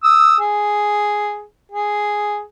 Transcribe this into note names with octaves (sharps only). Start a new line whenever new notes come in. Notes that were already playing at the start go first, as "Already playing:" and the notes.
D#6 E6
G#4
G#4